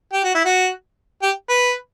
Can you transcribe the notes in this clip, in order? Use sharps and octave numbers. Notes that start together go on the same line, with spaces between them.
G4
F#4
E4
F#4
G4
B4